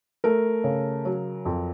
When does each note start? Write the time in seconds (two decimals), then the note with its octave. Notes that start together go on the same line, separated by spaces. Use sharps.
0.24 A3 A#4
0.64 C#3
1.05 F#3
1.45 F2